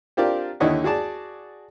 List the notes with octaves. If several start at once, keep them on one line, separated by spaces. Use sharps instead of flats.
C4 D4 F4 G4 A#4 D5
D#2 D3 E4 C#5 D#5 F#5
F#4 G#4 D5 A5